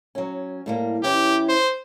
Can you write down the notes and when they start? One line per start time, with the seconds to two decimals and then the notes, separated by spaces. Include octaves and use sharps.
0.15 F#3 C#4
0.66 A2 G3 A#3
1.03 E3 C#4 E4 G4
1.49 C5